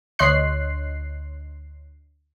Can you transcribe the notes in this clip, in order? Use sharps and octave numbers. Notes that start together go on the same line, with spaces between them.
D2 C#5 D#5 C6 F#6 C7